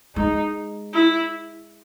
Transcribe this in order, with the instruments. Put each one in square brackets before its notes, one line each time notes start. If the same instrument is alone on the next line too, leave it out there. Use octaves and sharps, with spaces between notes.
[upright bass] G#3 [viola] D#4
[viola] E4